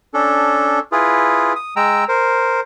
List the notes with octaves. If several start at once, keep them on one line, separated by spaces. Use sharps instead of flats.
C#4 D4 A4
E4 F4 G#4 B4
D#6
G#3 G5 A#5 E6
A#4 C5